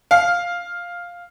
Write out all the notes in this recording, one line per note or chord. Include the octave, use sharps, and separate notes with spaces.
F5